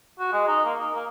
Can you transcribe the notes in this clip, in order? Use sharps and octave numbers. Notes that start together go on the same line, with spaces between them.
F#4
G#3
D#4
A#3
D#4
A#3